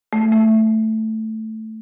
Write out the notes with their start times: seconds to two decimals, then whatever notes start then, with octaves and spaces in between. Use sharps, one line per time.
0.13 A3
0.32 A3